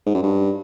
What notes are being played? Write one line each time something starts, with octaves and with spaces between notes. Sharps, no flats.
G#2
F#2
G2